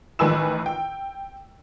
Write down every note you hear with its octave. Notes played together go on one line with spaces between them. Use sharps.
A1 D#3 B4 G#5 E6 E7
G5